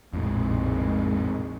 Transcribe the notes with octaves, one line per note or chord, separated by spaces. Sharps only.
A#1 F2 A2 C3 D#3 G#3